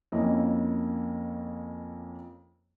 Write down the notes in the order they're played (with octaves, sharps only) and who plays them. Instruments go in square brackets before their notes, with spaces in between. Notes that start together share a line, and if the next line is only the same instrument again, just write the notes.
[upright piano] F2 A#3 C#4 E4 D#5